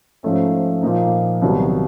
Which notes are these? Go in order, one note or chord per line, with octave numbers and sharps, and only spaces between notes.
G#2 F3 A3 C#4
A#2 F3 A#3 D#4
C2 C3 D#3 F#3 B3